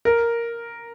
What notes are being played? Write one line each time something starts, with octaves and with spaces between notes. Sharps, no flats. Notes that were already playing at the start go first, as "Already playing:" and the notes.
A#4